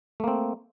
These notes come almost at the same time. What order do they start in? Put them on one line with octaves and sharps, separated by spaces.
A3 A#3 C4